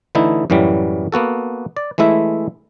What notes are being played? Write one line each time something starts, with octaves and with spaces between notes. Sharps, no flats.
D3 E3 A3 D#4 E4
F#2 A2 E3 F#3 G3
A#3 B3 F#4 A4
D5
E3 G#3 A3 E4 E5